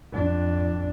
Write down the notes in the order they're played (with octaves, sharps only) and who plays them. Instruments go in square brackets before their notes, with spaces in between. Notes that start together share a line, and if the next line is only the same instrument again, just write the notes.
[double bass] F2 D4